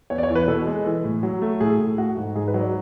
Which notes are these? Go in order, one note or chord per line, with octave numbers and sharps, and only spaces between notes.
E2 C#5
D5
C#5
E3
B4
B2 A4
G#3
E3
A2
F#3
A3
A2 G#4
A2
A3 F#4
G#2
G#2 G#4
B4
F#3
D5